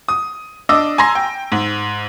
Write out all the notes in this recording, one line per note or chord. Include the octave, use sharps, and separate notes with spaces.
D#6
D4 D#5 D6 E6
G#5 A#5 C6 A#6
G5
G#2